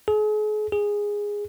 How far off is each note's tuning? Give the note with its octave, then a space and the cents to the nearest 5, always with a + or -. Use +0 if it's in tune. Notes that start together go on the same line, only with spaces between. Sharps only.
G#4 +40
G#4 -10